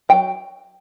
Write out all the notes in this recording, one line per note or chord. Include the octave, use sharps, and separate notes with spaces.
F#3 G5